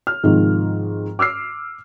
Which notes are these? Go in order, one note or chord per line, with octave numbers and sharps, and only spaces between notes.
F6
G#2 C3 D#3 F3
D6 E6 F6 C7